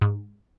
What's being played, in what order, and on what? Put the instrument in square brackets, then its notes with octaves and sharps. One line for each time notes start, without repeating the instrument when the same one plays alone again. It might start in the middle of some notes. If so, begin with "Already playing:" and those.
[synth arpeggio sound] G#2